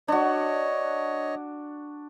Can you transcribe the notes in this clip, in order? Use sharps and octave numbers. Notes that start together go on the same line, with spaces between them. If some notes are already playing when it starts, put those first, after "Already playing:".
D4 F#4 C#5 D#5